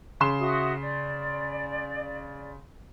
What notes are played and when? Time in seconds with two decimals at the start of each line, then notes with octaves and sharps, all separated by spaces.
0.20 C#3 C6 E7
0.40 F#4 E5 D#6
0.80 D5